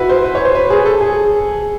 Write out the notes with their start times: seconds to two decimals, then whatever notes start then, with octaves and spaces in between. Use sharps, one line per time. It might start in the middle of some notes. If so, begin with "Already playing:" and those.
Already playing: E4 F#4 B4
0.09 C5
0.24 B4
0.35 C#5
0.45 C5
0.55 B4
0.70 G#4
0.86 A4
1.01 G#4